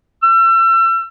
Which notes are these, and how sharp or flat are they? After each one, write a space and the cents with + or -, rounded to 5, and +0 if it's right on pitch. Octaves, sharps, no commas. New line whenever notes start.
E6 +35